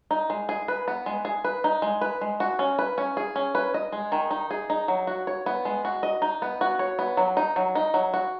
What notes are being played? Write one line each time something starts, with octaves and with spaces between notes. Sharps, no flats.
D#4
G#3
G#4
B4
B3
G#3
G#4
B4
D#4
G#3
B4
G#3
F#4
C#4
B4
C#4
G#4
C#4
B4
D#5
G#3
D#3
D#4
G#4
D#4
F#3
F#4
C#5
B3
G#3
F#4
D#5
D#4
B3
F#4
C#5
B3
F#3
D#4
F#3
D#4
F#3
F#4